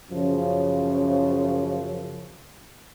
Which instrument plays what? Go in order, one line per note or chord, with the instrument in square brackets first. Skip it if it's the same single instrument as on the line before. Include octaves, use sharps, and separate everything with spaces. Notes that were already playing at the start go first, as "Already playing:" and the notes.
[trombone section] F#2 C#3 F3